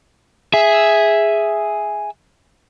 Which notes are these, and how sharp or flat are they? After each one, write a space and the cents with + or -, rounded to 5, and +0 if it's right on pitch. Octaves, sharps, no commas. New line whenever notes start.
G#4 +0 E5 +0